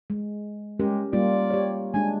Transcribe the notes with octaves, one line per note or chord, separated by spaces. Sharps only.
G#3
G#3 C#4 G4 A#4
G3 A#3 F4 D5
G4 C#5
G#3 D4 G#5